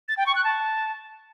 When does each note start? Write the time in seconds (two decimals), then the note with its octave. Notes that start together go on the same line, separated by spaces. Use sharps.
0.08 A6
0.17 G5
0.26 C#6
0.35 F#6
0.44 A5